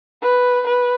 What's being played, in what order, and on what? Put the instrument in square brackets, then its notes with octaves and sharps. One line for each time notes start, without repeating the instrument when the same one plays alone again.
[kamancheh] B4
B4